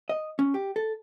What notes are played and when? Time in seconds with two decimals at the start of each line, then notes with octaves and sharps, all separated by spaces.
0.09 D#5
0.39 C#4
0.54 G4
0.76 A4